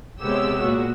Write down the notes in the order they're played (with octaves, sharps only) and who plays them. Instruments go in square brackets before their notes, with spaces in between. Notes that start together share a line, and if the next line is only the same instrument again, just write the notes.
[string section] C3 G#3 B3 G4 C#5 E6
A#2 F#4